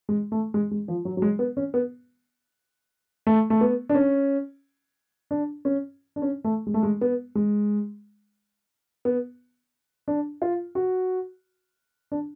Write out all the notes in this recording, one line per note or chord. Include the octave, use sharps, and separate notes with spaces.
G#3
A3
G#3
G#3
F3
F#3
F#3
G#3
B3
C#4
B3
A3
A3
B3
D4
C#4
D4
C#4
D4
C#4
A3
G#3
A3
G#3
B3
G#3
B3
D4
F4
F#4
D4